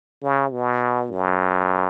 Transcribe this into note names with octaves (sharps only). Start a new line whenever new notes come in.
C#3
B2
F#2